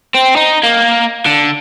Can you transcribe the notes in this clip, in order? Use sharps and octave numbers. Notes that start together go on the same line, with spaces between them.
C4
D#4
A#3
D3